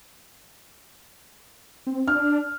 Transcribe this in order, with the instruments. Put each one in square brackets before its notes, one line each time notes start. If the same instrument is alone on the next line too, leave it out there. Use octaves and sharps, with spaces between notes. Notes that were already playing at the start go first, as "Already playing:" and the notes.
[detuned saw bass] C4
[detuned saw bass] D4 [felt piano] F6